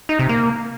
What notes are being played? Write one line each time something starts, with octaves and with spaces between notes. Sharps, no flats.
D#4
C3
A#3